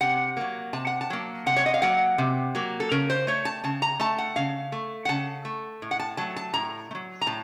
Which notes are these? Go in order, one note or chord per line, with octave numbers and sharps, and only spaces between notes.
C3 F#5
F#3 A#3
C3 A5
F#5
A5
F#3 A#3
C3 F#5
C#5
D#5
F5
F#3 A#3 F#5
C3
F#3 A#3
A4
C#3 A#4
C5
A3 C#5
A5
C#3 A5
A#5
A3 A5
F#5
C#3 F5
A3
F#5
C#3 A5
A3
A2
F#5
A5
F#3 A3 A5
A5
A2 A#5
A3
F#3
A#5
A2 A5